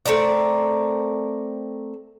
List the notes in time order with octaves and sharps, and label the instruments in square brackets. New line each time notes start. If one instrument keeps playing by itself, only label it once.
[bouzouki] A3 C4 A#4 D5